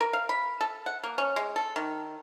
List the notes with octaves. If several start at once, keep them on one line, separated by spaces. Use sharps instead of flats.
A#4
F5
B5
A4
F#5
A#3
C#4
G#3
A4
D#3